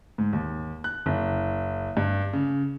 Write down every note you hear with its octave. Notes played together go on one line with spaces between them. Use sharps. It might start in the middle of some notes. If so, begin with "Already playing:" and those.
G#2
D#2
F#6
F#1
G2
C#3